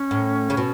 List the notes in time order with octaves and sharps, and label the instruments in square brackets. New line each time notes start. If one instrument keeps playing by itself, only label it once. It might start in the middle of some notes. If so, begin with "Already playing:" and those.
Already playing: [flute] C#4
[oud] A2
C#3
B2